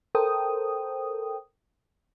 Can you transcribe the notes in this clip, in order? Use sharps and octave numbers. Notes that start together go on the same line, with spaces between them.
A4 A#4 C5 G5 D#6